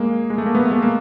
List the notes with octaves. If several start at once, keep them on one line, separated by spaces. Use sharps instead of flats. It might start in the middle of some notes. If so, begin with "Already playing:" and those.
Already playing: G#3 A#3
G#3
A3
A#3
A3 B3
A3
G#3 A#3
A#3